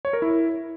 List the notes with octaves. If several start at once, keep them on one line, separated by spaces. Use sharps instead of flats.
C#5
A#4
E4